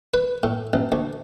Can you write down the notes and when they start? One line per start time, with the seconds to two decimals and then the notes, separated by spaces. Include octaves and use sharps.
0.14 B4
0.43 A2
0.73 A1
0.92 D2